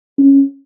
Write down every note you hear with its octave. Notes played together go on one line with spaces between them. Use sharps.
C#4